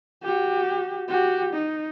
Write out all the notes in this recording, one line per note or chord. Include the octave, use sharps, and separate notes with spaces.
F#4 G4
F#4 G4
D#4